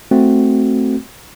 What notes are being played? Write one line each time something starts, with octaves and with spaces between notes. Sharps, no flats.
A3 C4 F#4